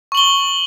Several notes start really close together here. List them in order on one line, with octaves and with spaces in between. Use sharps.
C#6 F#7 G7